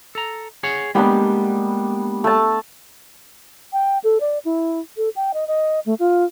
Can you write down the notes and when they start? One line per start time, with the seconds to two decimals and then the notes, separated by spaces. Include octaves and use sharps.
0.15 A4 A#5
0.63 G#4 C#5 F#5
0.95 G3 G#3 A#3 B3 D4 G4
2.24 A3 A5
3.73 G5
4.04 A4
4.20 D5
4.45 E4
4.97 A4
5.16 G5
5.34 D#5
5.48 D#5
5.86 A3
5.99 F4